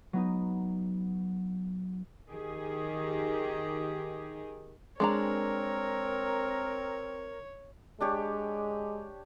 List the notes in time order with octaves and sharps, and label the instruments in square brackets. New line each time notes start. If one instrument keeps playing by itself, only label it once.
[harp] F#3 B3 D#4
[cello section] D#3 G4 G#4
[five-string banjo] G#3 D4 A#5 [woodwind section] C4 A#4 [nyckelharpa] C#5
[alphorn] G#3 [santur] D4 G4 C#5